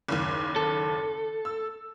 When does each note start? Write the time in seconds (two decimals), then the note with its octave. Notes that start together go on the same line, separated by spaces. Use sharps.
0.09 F#1 D#2
0.56 A4
1.45 E6